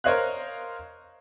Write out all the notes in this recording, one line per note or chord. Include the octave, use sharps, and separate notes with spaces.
A#4 C5 C#5 D#5 F5 F#6